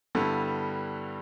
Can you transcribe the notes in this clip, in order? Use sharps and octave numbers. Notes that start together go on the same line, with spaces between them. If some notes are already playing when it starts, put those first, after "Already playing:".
G2 D3 G3 B3 E4